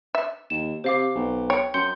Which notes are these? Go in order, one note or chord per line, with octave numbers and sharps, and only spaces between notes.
E5
D#2 E7
C3 C5 F5 D6
B1
C#5 G5 C#7
F#2 C6 G6 C#7